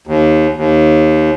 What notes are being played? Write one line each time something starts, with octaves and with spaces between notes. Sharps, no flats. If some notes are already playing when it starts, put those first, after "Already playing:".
D#2
D#2